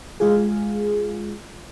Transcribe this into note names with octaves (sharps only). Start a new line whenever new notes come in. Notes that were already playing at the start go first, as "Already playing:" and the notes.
G#3 F4 G#4